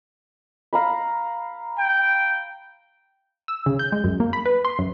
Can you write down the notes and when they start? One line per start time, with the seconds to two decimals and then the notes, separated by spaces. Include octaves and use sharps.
0.73 F5 A#5 B5
1.79 G5
3.48 E6
3.66 C#3
3.79 G6
3.92 G#3
4.04 F#2
4.20 A#3
4.33 B5
4.46 B4
4.65 C6
4.79 F#2